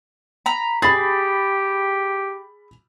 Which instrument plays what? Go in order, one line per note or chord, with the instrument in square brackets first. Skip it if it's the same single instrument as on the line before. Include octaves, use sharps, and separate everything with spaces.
[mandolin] A#5 B5
[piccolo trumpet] G4 [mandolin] G#4 [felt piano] B5 A6